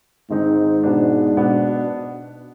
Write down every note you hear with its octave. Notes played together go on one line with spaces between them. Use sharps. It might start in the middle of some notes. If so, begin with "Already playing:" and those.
G#2 D#3 G#3 C4 D#4
B2 B3 D4
B2 B3 D4